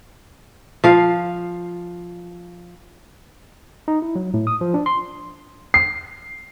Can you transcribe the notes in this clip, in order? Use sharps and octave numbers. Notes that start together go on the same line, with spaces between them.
F3 F5
D#4
E4
F#3
A2
D#6
F3
D4
C6
C7